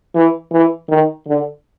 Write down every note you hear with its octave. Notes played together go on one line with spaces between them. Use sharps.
E3
E3
D#3
D3